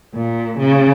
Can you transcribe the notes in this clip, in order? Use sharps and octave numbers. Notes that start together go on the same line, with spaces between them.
A#2
C#3